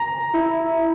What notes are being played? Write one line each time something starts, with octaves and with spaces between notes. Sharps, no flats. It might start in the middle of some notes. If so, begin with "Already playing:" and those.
Already playing: A#5
E4